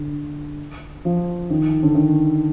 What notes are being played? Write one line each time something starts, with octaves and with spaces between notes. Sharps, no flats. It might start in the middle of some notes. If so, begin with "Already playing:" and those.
Already playing: D3
F3
D#3
D3
D#3